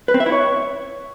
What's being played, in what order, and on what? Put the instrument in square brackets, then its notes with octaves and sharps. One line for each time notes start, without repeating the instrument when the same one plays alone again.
[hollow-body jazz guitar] B4
C4
E5
E4
C#5